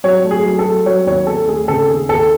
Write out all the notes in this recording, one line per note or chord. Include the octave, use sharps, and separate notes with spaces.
F#3 C#5
A3
G#4
F#3
A4
F#3
F#3 C#5
D#2 C#5
D#2 A4
A3 G#4
C#3 A4
D#2 G#4
D#2 A4